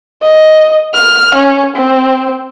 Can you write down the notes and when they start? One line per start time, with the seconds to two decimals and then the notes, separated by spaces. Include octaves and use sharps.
0.22 D#5
0.93 F6
1.34 C#4
1.75 C4